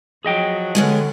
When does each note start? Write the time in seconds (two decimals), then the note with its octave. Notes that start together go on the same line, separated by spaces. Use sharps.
0.25 F3 F#3 G#4 D#5 G5
0.75 D3 G#3 B3 C#4